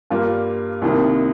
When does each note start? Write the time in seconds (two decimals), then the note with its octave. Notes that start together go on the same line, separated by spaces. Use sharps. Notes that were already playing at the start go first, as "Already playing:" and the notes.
0.10 G2 G3 A#3 F4
0.82 C2 C3 D#3 A#3